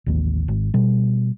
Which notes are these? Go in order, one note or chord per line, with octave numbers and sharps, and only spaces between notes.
A1 D#2
G#1
B2 G3